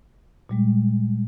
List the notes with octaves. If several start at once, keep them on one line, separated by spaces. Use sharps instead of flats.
A#2 G3 G#3